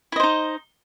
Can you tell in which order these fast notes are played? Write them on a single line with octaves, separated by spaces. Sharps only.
E4 D#5 C5 D#4